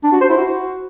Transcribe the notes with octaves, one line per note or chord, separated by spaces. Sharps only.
D4
F#4
C5
E4
F#4